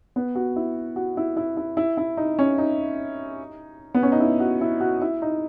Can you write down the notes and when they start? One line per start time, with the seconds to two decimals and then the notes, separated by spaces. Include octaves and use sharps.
0.16 B3
0.35 F#4
0.56 E4
0.96 F#4
1.17 E4
1.37 E4
1.57 E4
1.77 E4
1.97 E4
2.17 D#4
2.39 C#4
2.58 D#4
3.94 B3
4.03 C#4
4.12 D#4
4.20 E4
4.40 F#4
4.61 E4
4.80 F#4
5.02 E4
5.22 D#4